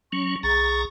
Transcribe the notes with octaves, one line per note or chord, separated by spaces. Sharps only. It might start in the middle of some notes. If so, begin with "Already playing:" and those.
F#3 C#4 C#6
B1 G#4 A#5 C#6 A6